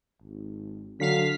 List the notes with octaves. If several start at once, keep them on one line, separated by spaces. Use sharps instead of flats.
G#1
D3 F#3 F5 B6